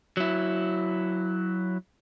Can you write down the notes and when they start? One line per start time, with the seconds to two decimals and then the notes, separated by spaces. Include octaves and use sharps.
0.17 F#3 E4